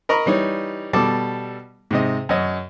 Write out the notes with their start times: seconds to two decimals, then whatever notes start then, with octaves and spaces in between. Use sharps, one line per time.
0.09 A#4 D#5 A#5 B5 C#6
0.26 E3 G3 D#4 C#5
0.93 B2 G3 A4 A5 D6
1.91 G#2 C3 D#5
2.29 F#2 C#5 D#5